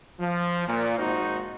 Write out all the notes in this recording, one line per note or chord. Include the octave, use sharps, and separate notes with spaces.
F3
A#2
G#1 D#4 F#4 C5